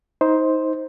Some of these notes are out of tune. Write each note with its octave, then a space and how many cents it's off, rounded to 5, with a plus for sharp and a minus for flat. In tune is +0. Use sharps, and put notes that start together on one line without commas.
D#4 +25 C5 +0